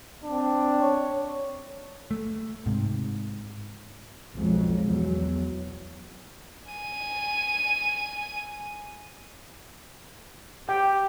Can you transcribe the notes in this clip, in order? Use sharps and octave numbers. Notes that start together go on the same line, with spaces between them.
C4 D4
C#5
A3
G#2 C3
B1 F2 F3 F#3 G#3
E2 F#3
G#5 D#7
G4 G5